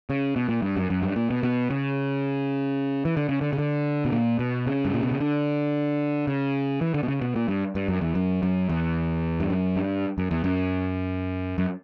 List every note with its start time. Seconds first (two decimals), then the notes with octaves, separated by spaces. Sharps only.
0.10 C#3
0.36 B2
0.49 A#2
0.62 G2
0.76 F#2
0.90 F#2
1.02 G2
1.16 A#2
1.30 B2
1.43 B2
1.70 C#3
3.05 E3
3.17 D3
3.29 C#3
3.41 D3
3.53 C#3
3.58 D3
4.05 B2
4.12 A#2
4.39 B2
4.67 C#3
4.85 G2
4.94 A#2
5.03 B2
5.11 C#3
5.20 D3
6.27 C#3
6.81 E3
6.94 D3
7.03 B2
7.08 C#3
7.21 B2
7.36 A#2
7.48 G2
7.75 G2
7.88 F#2
8.01 E2
8.15 F#2
8.43 F#2
8.69 E2
9.40 G2
9.50 F#2
9.76 G2
10.18 F#2
10.31 E2
10.44 F#2
11.58 F#2